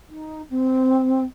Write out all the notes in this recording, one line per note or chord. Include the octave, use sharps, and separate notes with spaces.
D#4
C4